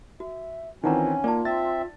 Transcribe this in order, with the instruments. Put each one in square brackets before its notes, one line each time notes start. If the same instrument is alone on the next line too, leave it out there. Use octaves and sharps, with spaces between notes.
[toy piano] F#4 [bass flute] E5
[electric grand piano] D#3 E3 C4 [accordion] C#4 [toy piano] D#4 F#5 A#5 [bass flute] F4
[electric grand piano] A#3 [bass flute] F4 [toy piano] D5 A5
[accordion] C4 E5 [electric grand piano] A6